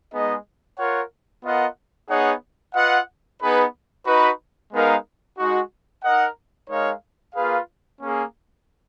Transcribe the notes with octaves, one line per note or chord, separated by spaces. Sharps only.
G#3 B3 D#4 G#4 D#5
F4 A#4 C#5 F#5
B3 F4 A#4 D#5 F#5
B3 D#4 G#4 C#5 F#5
F4 B4 D#5 F#5
B3 D#4 G#4 B4
D#4 F#4 B4
G#3 B3 D#4 A#4 F5
G#3 D#4 F#4
D#4 A#4 D#5 F#5
G#3 D#4 A#4 C#5 F5
A#3 F4 G#4 B4 F5
A#3 C#4 G#4